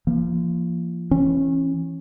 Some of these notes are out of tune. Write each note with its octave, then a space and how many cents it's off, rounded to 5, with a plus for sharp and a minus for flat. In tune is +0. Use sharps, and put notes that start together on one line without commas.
F3 -30 A#3 +10
E3 +10 C#4 -25